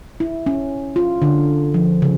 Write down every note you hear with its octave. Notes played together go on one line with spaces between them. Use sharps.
E4
C#4
F4
D3
F3
C#3